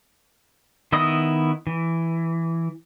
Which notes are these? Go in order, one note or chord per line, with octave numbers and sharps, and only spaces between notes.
D#3 B3 E4 D#5 D#6
E3